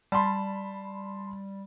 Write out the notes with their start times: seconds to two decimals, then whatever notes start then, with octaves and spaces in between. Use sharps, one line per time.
0.12 G3 A5 B5 C6